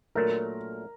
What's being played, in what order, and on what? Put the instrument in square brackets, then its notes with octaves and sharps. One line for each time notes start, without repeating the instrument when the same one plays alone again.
[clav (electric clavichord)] A#2 F#3 A3 D4 [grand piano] A#4